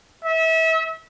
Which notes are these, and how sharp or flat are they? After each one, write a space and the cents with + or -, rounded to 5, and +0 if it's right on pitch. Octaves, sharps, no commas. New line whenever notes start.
E5 -30